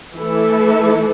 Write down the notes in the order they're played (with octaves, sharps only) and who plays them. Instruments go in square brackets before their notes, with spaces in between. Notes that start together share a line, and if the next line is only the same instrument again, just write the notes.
[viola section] E3 A3 E4 A4